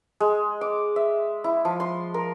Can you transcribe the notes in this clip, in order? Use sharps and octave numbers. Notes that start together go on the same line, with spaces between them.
G#3
D6
E5
E4
F3
C6
A#4